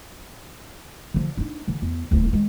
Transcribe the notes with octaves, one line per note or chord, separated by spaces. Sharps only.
D3 F3
D4 D#4
D3 E3
E2
D#1 D2
D#3 G#3